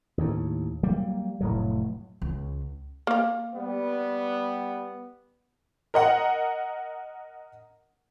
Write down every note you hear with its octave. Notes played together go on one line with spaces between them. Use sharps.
D#2 A2
F#3 G3 A#3
F1 A2 F#3
C#2
A#3 F5
G3 B3
A#4 D#5 F#5